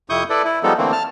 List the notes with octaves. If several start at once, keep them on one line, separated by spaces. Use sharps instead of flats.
F2 C3 E4 C#6 D#6 G6
E4 A4 B4 D5
E4
F3 G3 G#3 B3 D#4 A4
D3 E3 A3 A#3 C4
A5 F6